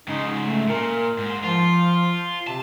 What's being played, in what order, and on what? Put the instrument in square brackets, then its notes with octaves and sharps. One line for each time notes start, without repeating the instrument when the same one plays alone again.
[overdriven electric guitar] G#2 C#3 [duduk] D#4
[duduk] A3
[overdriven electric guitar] A#2 [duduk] A#4
[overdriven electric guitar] G#2
[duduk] F3 [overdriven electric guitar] F4
[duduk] C3 [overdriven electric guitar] A5